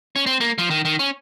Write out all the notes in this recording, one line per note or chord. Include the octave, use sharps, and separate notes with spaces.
C#4
C4
A#3
F3
D#3
D#3
C#4